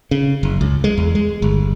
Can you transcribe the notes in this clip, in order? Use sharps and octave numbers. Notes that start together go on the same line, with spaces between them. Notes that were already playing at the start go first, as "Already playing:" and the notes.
C#3
F#1
C#2
G#3
E2
G#3
G1